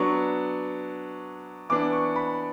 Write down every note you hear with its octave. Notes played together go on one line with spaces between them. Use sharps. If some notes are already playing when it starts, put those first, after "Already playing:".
Already playing: F#3 B3 D4 C#6
E3 B3 D4 D6
C#6
B5